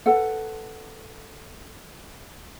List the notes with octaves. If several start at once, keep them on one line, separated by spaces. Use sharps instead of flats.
A4 B4 F#5